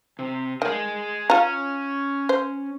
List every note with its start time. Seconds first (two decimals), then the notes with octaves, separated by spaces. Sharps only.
0.19 C3
0.62 D#3 G#4 D#5
1.30 C#4 F4 A#5
2.29 C5